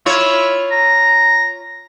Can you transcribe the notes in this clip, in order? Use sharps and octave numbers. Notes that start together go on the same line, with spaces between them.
E4 F4 C#5
A#5